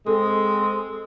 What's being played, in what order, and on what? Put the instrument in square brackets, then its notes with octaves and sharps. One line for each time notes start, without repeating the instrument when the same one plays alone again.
[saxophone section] G#3 C4 [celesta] A4